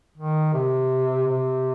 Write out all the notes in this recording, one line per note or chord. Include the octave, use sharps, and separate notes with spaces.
D#3
C3
C3